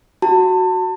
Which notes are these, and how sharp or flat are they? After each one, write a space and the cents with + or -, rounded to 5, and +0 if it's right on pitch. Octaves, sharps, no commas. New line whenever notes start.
F#4 +0 A5 +30